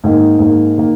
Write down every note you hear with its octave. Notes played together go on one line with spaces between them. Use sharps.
G#2 D#3 A#3
G#2 D#3 A#3
D#3 A#3